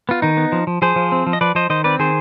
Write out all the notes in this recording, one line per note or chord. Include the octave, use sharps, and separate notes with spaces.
B3 F4
D#3 D#4
B3
F3
F3
F3 G#4 C5
F3
C4
F3
D#5
F3 B4 D5
F3 C5 D#5
D#3 C5 D#5
C4 B4 D5
D#3 G#4 C5